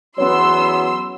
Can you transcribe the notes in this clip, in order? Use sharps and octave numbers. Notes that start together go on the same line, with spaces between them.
E2 F#3 B3 C#4 C#5 C6 E6